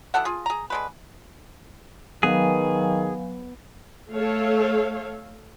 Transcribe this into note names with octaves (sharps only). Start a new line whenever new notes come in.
B2 E3 A4 F#5
F4 G#4
G#4 A#5
D3 G#3 B4
D#3 F#3 B3 G#4 F5 G#5
A3 A4 C#5 F5